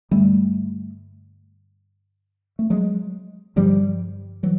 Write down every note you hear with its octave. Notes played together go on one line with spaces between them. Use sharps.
G2 D3 G3 A3
A3
F#3 G#3
G2 D3 F3 G3
E3 F#3